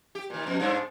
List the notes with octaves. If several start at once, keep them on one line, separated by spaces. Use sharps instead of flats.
G4
A#2 D#3
F2 B2
G2 C4 D4